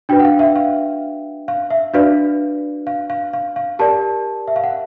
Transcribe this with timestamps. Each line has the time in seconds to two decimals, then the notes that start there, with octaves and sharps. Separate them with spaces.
0.09 D4 F#4 B4 G5
0.20 F#5
0.25 F5
0.39 E5
0.56 F5
1.48 F5
1.70 E5
1.94 D4 F#4 B4 D5 F5
2.87 F5
3.10 F5
3.33 F5
3.56 F5
3.79 G4 A#4 D5 A5
4.48 E5
4.56 F5
4.64 F#5